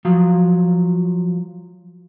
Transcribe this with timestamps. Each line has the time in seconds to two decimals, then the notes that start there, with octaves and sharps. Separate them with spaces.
0.05 F3 F#3